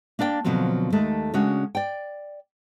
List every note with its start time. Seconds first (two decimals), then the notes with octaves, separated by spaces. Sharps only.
0.19 A#3 D4 D5 E5 G5
0.44 B2 D3 F3 F#3 A#3 C4
0.92 D#2 G#3 A3 A4
1.34 C#3 G#3 C#4 D4 F#4
1.75 D5 G5